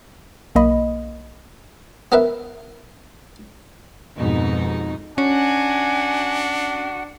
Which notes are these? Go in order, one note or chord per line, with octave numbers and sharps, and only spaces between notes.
B1 A#3 D#5 B5
B3 A#4 B4 E5
F2 G#2 B2 D#4
C#4 D4 F#4 G#5